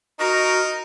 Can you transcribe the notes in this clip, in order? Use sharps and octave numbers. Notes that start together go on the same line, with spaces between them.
D#4 F#4 A#4